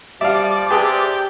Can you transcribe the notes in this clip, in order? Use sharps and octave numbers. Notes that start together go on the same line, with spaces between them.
F3 G3 D5 E5 F5
C3 G4 G#4 B4 A5